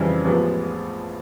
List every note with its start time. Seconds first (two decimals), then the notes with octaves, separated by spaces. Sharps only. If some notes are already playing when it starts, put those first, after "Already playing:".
Already playing: F2 C#3 E3 G3
0.25 A1 A2 F3 G#3 B3